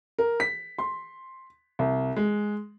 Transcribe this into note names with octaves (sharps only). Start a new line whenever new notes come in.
A#4
B6
C6
C2
G#3